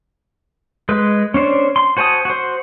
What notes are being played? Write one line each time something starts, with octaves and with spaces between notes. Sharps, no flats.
G#3 B4
C#4 D4 C5
C6
F#4 C5 G#5 A5 D#6
F#4 C5